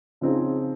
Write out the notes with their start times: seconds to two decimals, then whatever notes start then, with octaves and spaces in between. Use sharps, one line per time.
0.21 C#3 F3 C4 D#4 G#4